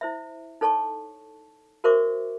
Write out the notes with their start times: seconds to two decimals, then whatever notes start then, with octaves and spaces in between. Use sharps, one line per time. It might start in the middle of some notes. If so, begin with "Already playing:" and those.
0.01 E4 C5 E5
0.61 D#4 A4 C#5 A5 C#6
1.84 F#4 A#4 C5 E5 C#6 D6